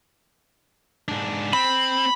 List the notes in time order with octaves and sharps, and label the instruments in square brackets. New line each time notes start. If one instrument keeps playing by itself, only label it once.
[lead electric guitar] G#2 D4
[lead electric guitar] C4 [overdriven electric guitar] B5